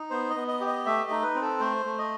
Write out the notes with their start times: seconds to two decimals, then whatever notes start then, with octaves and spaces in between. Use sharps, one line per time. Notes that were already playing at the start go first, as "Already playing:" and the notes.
Already playing: D#4
0.10 B3 C5
0.30 D#5
0.36 B3
0.48 D#5
0.61 G4
0.67 D#5
0.86 A3 E5
1.04 D#5
1.11 D#4
1.23 B4
1.35 C4
1.42 A4
1.60 A3 C5
1.85 A3
1.98 D#5